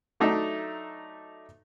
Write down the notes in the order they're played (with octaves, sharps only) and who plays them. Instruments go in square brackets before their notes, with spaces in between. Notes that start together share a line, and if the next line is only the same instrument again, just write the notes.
[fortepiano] F#3 A3 D4 D#4 E5